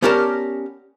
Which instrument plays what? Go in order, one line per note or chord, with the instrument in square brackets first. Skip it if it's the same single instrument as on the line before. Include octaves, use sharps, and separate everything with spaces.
[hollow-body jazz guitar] B3 C#4 G4 A#4 D5 A5